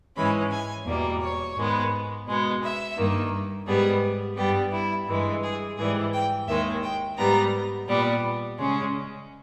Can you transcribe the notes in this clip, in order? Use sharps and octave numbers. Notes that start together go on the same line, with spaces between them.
G#2 E3 G#3 C#4 B5
G#5
E2 B2 G3 A#3
C#5
G#2 D#3 G#3 B3
B2 G#3 B3
E5
G2 D#3 A#3
G#2 G3 B3 G#4
G2 G3 B3 G4
E4
G2 E3 G#3
G#4
G#2 E3 G3 G#4
G5
D#2 D#3 G#3 E5
G5
G#2 G3 B3 A#5
A#2 G3 B3
C#3 G#3 C#4